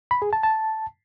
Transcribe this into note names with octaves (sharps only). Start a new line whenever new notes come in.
B5
G#4
A5
A5